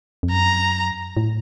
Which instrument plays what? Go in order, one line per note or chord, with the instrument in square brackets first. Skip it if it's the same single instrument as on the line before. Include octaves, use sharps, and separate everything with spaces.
[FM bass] F2
[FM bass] F#2 [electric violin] A#5
[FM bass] A2